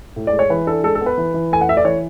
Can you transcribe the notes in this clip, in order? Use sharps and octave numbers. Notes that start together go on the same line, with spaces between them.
A2
D5
G#3
C#5
E3 B4
D4 A4
G#3 A4
A4
B3
B4
E3
E3
A3 G#5
F#5
A3 E5
D5
E3 C#5